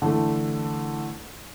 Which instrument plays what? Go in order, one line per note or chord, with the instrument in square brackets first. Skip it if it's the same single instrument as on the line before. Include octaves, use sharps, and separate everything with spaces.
[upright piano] D3 E3 A3